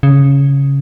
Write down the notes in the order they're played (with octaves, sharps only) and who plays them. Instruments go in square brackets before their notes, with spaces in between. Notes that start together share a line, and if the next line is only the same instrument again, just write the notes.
[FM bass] C#3